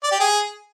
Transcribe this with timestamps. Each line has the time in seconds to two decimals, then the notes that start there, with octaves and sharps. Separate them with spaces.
0.03 D5
0.12 G4
0.20 G#4